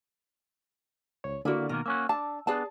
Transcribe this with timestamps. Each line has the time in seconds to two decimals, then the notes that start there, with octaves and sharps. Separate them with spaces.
1.24 C#2 C#5
1.45 D3 A#3 E4 F#4 D5
1.69 B2 D#3 A#3 A#4
1.86 A#3 C#4 F#4 E6
2.09 D4 A5
2.47 B3 D4 G#4 D5 A5